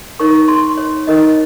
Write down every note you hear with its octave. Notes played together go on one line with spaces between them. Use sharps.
D#4 A#4 C#5 C#6
C6
C#5
D#4 A#4 C#5 D#5